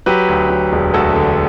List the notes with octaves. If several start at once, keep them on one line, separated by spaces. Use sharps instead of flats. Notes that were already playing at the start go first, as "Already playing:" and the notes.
F#3 G4 B4
D2
F#3
E1
D2 F#4 A4
D3